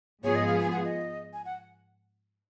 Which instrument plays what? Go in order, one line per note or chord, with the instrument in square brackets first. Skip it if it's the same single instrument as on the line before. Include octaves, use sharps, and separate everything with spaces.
[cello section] G#2 F3 B3 F4 G#4 [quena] C#5
[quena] D#5
F5
G#5
F#5
D#5
G#5
F#5